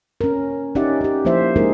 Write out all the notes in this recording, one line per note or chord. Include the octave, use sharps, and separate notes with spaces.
C#4 A#4
C#4 D#4 G4 D5 E5 F#5
C#4 G4
F3 A#3 E4 C5 E5
G#3 A#3 D#4 G#4 A#4